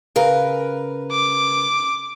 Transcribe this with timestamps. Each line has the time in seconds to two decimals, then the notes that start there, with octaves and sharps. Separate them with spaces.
0.16 C#3 A#4 B4
1.11 D6